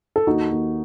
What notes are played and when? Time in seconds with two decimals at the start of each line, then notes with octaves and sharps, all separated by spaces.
0.16 A4
0.27 D#2 D#4 F#4
0.51 D#2